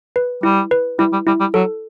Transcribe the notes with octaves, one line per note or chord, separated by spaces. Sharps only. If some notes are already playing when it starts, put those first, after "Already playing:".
B4
G3 E4
B4
G3 E4
G3
G3 E4
G3
F#3 A4